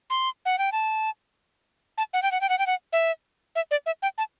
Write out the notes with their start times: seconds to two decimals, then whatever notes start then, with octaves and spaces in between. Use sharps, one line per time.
0.10 C6
0.45 F#5
0.58 G5
0.72 A5
1.98 A5
2.13 F#5
2.23 G5
2.32 F#5
2.41 G5
2.49 F#5
2.59 G5
2.67 F#5
2.93 E5
3.56 E5
3.71 D5
3.86 E5
4.02 G5
4.18 A5